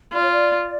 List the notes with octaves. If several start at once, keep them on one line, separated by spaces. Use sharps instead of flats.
F4 D5
C#5
D5